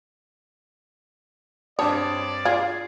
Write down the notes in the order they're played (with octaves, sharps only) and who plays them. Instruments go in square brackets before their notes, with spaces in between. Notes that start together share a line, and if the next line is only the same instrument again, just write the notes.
[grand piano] G2 C4 D4 [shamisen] C#5 [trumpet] D5 [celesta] A5 D6 D#6
[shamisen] F4 G#4 [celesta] G#6 C7